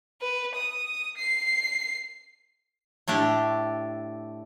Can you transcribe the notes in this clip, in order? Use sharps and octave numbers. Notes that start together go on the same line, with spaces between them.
B4
D#6
C7
A2 A3 D4 G4